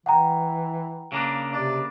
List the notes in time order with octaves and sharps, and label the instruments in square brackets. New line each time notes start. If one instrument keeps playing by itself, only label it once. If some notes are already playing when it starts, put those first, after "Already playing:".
[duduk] E3 [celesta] F#5 G5 A#5
[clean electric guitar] C#3 A#3 D4
[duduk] C3 [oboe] D5